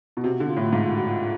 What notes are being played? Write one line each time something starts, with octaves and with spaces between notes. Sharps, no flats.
B2
C3 F#4
D3
F4
A2
G#2 F4
F4
F#4
F4